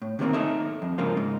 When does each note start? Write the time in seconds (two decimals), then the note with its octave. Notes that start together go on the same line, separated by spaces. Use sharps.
0.02 A2
0.19 C3 D#3 G3 A3 A#3 C4
0.33 D#4 A4 E5
0.82 F2
0.98 G#2 C#3 F3 A#3 F4
1.17 G#2